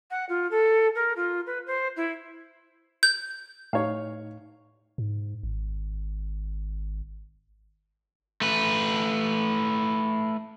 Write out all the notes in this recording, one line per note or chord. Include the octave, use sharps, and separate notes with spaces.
F#5
F4
A4
A#4
F4
B4
C5
E4
G6
A2 D#4 C#5 F5
G#2
G#1
A3 B4